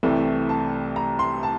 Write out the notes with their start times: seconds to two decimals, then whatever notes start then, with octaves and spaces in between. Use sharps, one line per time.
0.03 C2 C3 E3 A3
0.49 A5
0.96 A#5
1.19 C6
1.43 A5